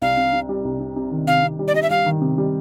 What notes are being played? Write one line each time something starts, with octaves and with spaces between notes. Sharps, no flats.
C2 F5
C3
C3
G3
C2
C3
C3
D#3
C3 F5
C3
G3
D5
G3 D#5
E5
G3 F5
D#3
C3
G3